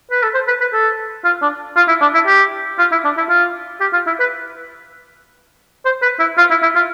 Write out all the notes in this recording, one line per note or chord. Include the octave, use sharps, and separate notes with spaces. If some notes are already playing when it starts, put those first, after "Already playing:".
B4
A4
C5
B4
B4
A4
F4
D4
F4
E4
D4
E4
G4
F4
E4
D4
E4
F4
G4
F4
E4
B4
C5
B4
E4
F4
E4
E4
F4